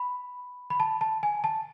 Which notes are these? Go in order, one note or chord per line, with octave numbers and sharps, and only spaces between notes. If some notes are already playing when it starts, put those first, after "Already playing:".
Already playing: B5
B5
A5
A5
G#5
A5